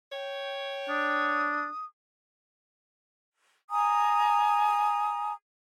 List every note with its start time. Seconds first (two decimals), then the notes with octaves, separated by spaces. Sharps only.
0.12 C#5 G5
0.89 D4 D#6
3.70 G#5 A#5 D#6